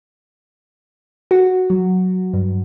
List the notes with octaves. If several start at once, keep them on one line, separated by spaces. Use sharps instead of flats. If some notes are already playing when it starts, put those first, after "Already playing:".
F#4
F#3
G2